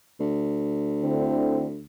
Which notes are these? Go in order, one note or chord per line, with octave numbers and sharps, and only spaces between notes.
D2
D3 C4 E4